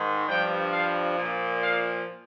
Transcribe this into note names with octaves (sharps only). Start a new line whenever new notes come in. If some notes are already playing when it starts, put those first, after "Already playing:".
Already playing: G#2 D#3
G2 F3 G5
F5
A#2 F3
F5